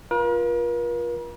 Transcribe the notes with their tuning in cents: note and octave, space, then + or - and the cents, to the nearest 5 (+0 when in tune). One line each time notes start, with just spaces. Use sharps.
F4 +0 A#4 +45